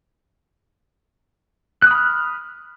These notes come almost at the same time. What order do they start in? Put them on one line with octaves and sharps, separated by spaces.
F#6 D#6 B5 F6